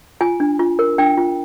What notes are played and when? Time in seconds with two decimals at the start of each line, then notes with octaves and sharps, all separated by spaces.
0.21 F4 G#5
0.40 D4
0.59 F4
0.79 A#4
0.98 D4 G5
1.18 F4